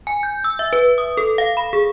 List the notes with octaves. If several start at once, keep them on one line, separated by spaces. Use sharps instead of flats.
G#5
G6
E6
E5
B4
D#6
A4
F5
B5
G#4